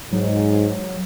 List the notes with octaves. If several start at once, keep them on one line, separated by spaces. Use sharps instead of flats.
G#2 F#3